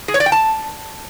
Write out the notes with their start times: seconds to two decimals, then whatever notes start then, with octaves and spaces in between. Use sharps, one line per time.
0.08 G#4
0.14 C#5
0.20 D5
0.26 G5
0.32 A5